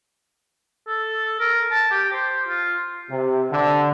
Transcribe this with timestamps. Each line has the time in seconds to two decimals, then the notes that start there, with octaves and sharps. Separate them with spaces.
0.88 A4
1.40 A#4
1.71 A5
1.91 G4
2.13 C5
2.48 F4
3.09 C3
3.51 D3